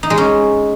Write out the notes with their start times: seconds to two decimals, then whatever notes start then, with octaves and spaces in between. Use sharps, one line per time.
0.03 D#4
0.10 G#3
0.18 C#4